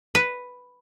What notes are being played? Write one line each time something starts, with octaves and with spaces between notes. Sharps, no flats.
B4